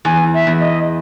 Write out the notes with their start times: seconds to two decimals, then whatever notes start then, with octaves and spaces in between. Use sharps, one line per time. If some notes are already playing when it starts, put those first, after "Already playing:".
0.05 E2 G#5
0.34 E5
0.47 E2
0.60 D#5